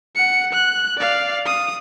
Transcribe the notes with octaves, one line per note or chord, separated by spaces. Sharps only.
F#5 C#7
F#6
D5 F5
D#6